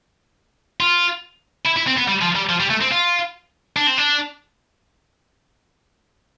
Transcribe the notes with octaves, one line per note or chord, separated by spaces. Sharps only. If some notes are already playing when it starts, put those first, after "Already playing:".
F4
E4
E4
C4
B3
G3
F3
G3
F3
G3
A3
C4
F4
D4
C4
D4